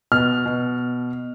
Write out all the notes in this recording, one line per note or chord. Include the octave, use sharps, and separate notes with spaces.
B2 F6
B2